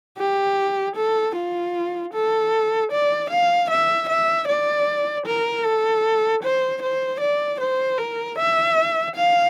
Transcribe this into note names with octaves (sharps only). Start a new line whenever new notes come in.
G4
A4
F4
A4
D5
F5
E5
E5
D5
A#4
A4
C5
C5
D5
C5
A#4
E5
F5